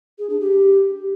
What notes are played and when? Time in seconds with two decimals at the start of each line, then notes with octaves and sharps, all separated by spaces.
0.19 G#4
0.30 D4
0.41 G4